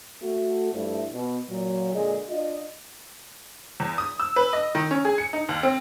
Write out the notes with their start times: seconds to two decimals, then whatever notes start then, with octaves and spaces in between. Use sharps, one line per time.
0.21 A3 F#4
0.73 G2 F3 A3 D4 E4
1.13 B2
1.49 A#2 F#3
1.93 A#2 D3 G#3 G#4 D#5
2.29 D4 F4 D#5
3.80 E2
3.98 D#6
4.20 E6
4.36 B4
4.53 D#5
4.75 D#3
4.91 C#4
5.05 G#4
5.18 C#7
5.33 D#4
5.49 D#2
5.63 C4